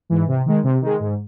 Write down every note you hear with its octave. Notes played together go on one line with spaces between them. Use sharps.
G#2 E3
C3
D#3 G#3
C3
D#3 G#3
G#2